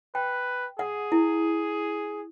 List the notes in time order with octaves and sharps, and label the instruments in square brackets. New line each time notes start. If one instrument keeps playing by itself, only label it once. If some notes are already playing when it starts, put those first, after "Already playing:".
[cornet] B4 [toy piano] G5
[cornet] G#4 [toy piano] F#5
[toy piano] E4